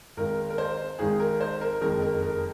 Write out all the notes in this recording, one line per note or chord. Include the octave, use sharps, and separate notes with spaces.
G#1 G#2 D#3 A#4
A#4
C5
G#1 G#2 D#3 G#4
A#4
C5
A#4
F#1 F2 D#3 G#3 A#4
A#4
A#4